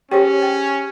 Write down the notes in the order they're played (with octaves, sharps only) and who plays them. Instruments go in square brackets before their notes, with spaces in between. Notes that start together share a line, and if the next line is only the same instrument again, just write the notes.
[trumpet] C#4 [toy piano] G4 G#4 [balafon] C5 C#5 G5
[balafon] G5